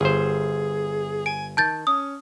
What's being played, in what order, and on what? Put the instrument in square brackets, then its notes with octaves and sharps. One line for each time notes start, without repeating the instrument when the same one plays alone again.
[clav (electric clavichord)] G1 C5 [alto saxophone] G#4
[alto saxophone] G#5 [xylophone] D7
[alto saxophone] D#3 [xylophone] A5 G6 A6
[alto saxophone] C#4 [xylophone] D#6